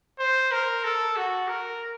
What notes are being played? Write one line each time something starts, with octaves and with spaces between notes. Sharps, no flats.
C5
A#4
A4
F#4
A#4